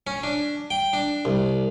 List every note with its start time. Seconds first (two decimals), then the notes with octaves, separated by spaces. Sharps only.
0.07 C#4
0.23 D4
0.71 G5
0.93 D4
1.25 C2